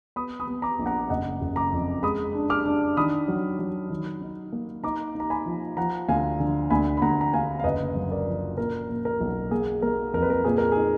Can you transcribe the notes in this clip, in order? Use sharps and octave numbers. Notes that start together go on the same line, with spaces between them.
B3 B5 D#6
B5 D#6
B3
A#5 D6
A#1
F#5 A#5
F#1 D#5 F#5
F#1
A#5 D6
F2
G#3 B5 D#6
D4
D6 F6
D4
D#3 B5 D#6
F#3
F#3
D#3
D#4
A#3
D#4 A#5 D6
D#4 A#5
G#5 B5
F3
F3 F#5 A#5
D2 F5 G#5
D3
D2 G#5 B5
B5
D2 F#5 A#5
A#5
D2 F5 G#5
F5
F#1 B4 D#5
F#2
A#4 D5
F3
A#2 A#4
A#2
A#4
B1
A#3 G#4
A#3 A#4
F2 A#4
B4
A#4
A#2 G#4
A#4
D#4 G#4